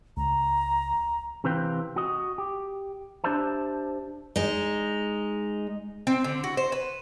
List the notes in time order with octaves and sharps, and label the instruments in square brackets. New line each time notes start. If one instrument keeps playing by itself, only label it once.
[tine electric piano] C#2 [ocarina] A#5
[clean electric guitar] C3 E3 C4 B4 F5 G5
F#4 D#5
G4
D4 G4 C5 D5 E5 A5
[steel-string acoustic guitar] G#3 D#4
[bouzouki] C4
D3
F#4
C5
B4